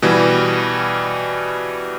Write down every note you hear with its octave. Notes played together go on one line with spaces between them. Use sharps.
B2 E3 G3